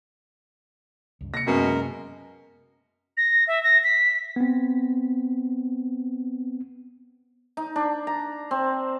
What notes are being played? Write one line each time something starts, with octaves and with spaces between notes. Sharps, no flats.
C#2 G2
C3 A#3 A#6 C#7
F#2 B2 G#3 A#4
A#6
E5
A#6
B6
B3 C4
D#4
D4
A#5
C4